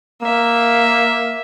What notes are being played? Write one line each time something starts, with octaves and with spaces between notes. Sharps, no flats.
A#3 E5